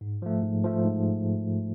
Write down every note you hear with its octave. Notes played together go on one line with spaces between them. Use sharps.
G#2
F3 A3
G#2
F3 A3
G#2